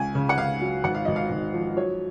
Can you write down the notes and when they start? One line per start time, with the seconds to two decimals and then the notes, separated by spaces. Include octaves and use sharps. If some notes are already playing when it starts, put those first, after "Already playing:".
Already playing: C#2 G#5
0.15 C#3
0.29 F#5
0.38 C#2 F5
0.61 F#3
0.84 G#1 F#5
0.95 F5
1.05 G#1 D#5
1.16 F5
1.30 G#1
1.54 F3
1.76 F#3 C#5